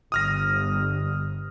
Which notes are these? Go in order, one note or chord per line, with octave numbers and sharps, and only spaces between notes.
G1 D#6 F6 A#6